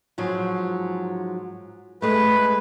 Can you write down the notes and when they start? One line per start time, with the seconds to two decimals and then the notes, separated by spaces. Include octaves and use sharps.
0.18 G#2 F3 F#3
2.02 G#3 A3 B4